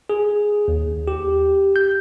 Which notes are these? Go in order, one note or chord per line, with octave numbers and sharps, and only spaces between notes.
G#4
D#2
G4
G6